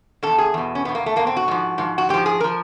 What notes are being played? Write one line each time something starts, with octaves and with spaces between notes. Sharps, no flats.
E2 B2 A4
G#4
E2 B2
C#4
E2 B2 B3
A#3
A3
E2 B2 A#3
C4
F#4
G#2 F3
G#2 F3
F#4
G#2 F3 G4
G#4
F3 A#4